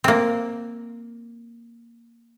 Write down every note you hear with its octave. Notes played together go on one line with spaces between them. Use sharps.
A#3 C4